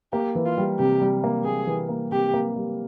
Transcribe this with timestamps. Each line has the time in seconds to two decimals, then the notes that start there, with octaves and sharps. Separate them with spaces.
0.13 A#3 G4
0.35 E3
0.46 F4
0.58 G3
0.79 C3 G4
1.02 G3
1.24 A#3
1.45 A#3 G#4
1.67 E3
1.89 A#3
2.11 C3 G4
2.34 A#3
2.56 G3